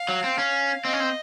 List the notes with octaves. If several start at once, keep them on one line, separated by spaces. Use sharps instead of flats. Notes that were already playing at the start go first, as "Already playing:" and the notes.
Already playing: F5
F#3
C4
C#4
C4 D#5
C#4
C4